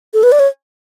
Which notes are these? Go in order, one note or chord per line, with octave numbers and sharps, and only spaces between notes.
A4
B4
D5
C#5